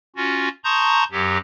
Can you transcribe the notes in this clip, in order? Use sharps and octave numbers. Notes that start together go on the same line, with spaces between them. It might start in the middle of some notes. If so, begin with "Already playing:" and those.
C#4 F4 F#4
A5 A#5 C6 C#6 D#6 G6
F#2 F#3 G4